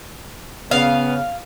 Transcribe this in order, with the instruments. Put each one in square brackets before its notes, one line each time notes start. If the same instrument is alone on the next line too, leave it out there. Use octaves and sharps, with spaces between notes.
[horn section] C#3 B3 [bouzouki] F5